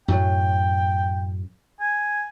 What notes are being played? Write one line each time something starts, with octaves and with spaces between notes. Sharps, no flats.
F#2 A2 F#3 G5
G#5